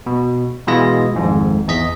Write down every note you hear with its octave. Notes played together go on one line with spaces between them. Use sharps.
B2
B2 E3 G#3 F4 D#5 A#6
G#1 F2 G#2
E2 D#5 B6